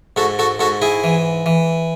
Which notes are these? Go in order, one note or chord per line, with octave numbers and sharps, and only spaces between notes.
G#2 F#4 A4
F#4 A4
G#2 F#4 A4
E4 G#4
E3
E3